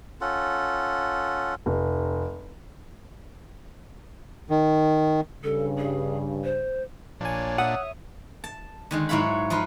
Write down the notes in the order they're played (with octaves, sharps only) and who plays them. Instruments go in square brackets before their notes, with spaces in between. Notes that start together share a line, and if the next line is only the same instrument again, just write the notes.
[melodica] C#4 F4 A4 F#5
[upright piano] F1
[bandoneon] D#3
[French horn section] G2 C#3 [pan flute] A4
[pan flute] G#4
C5
[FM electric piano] A#1 G#5 [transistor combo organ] A#2 D4 [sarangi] C#5
[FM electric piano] E5 D#6 [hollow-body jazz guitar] F#5
[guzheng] A5
D3 D#3 G#3
G#2 F#3 E4 C#5 F5 B5
F3 D#4 F4 B4